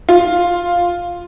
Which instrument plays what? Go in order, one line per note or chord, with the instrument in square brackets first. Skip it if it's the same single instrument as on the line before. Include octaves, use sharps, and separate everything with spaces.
[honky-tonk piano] F4